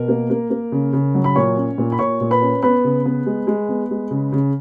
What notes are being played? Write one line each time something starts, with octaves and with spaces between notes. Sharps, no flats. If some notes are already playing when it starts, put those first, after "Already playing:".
Already playing: B2 A#4
A#3
A#3
A#3
C#3
C#3
F#3
B5
A#2 C#5 C#6
C#4
A#2
B5
A#2 C#5 C#6
A#2
B4 B5
C#4
B3 B4 B5
C#3
B3
G#3
G#3
B3
G#3
C#3
C#3